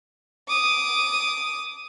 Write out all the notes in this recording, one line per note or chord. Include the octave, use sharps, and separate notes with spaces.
D6 D#6